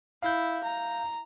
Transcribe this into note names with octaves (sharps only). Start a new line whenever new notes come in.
E4 F5 G6
A#5